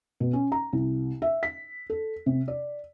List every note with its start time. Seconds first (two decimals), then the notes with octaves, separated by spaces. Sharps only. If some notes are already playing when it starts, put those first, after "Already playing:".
0.20 B2
0.33 C#4
0.52 A#5
0.73 C2
1.22 E5
1.43 B6
1.90 A4
2.26 C3
2.48 D5